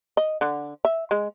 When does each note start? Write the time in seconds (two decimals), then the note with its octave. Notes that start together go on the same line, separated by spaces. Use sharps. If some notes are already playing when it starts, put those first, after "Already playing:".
0.17 D#5
0.41 D3
0.85 E5
1.11 G#3